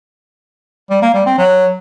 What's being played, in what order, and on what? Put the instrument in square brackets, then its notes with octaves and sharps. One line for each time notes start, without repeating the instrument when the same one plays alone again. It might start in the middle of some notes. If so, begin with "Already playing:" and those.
[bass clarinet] G3
A#3
G3
C4
F#3